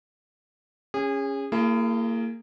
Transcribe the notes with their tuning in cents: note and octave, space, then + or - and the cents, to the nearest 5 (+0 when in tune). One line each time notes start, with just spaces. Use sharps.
C#4 +0 G#4 -30
A#3 -25 E4 +40 G#4 +0